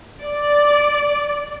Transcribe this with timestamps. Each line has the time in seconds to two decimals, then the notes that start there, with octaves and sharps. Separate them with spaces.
0.22 D5